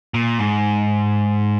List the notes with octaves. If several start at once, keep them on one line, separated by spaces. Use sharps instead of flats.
A#2
G#2